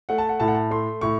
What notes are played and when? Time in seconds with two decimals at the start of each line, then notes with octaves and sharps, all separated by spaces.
0.09 A3 F#5
0.18 A5
0.29 F#5
0.40 A2 A5
0.48 F#5
0.55 A5
0.71 A3 C6
1.01 A2 C#6